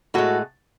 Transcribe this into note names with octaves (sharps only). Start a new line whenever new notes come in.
A2 G#3 F#4 A4